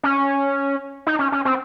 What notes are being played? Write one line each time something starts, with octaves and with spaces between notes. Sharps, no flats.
C#4
D#4
C#4
C#4
C4